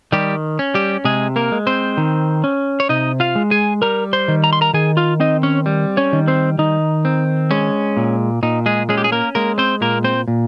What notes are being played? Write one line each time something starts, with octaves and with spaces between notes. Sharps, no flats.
D#3 G3 G4
C#4
G3 G4
C3 G#3 G#4
A#3 A#4
G#3
C4 C5
D#3
C#4
C#5
C3 D#4 D#5
F4 F5
G#3
G#4 G#5
G3 A#4 A#5
C5 C6
D#3
A#5
C6
A#4 A#5
D#3 G#4 G#5
F4 F5
C4 D#4 D#5
C#4 C#5
G3
C#4 C#5
D#3
C4 C5
D#3 D#4
C4
G#3 C#4
A#2
A#2 D#4
G#3 G#4
G#3 C#4 G#4
G4
G#4
A#3 A#4
G#3 A#3 A#4
C4 C5
A#2 A#3 A#4
C4 C5
A#2